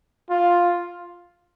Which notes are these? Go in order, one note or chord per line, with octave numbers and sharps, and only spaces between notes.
F4